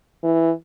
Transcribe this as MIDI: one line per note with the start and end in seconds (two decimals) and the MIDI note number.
0.23 0.51 52